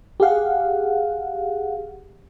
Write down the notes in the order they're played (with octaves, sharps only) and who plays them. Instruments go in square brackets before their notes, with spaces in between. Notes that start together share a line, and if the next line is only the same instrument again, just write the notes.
[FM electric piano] G4 G#4 F5 F#5